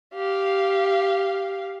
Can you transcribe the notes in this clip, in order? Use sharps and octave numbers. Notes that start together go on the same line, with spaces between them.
G4 F5